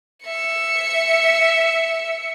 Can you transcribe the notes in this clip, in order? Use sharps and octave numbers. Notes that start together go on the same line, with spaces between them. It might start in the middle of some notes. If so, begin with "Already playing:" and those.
E5 C#7